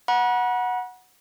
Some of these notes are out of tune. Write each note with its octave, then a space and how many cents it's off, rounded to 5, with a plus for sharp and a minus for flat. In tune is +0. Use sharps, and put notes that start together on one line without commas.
F#5 -10 B5 -45